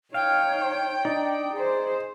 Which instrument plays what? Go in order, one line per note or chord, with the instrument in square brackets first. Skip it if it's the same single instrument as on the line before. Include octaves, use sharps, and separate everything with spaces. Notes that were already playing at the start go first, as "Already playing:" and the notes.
[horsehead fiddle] D#4 C#5 [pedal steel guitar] F5 [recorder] G5
[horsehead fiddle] D4 [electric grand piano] D#4 [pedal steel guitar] D5
[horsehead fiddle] G#4 C5